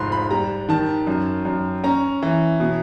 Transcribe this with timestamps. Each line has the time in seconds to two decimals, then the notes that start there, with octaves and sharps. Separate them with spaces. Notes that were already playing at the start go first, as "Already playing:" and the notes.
Already playing: F1 G#2 F3 B5 C6 F#6
0.12 B5
0.31 G3 A#5
0.69 D#3 A5
1.07 F#2
1.45 F#2
1.84 C#4 A#5
2.22 E3
2.60 B2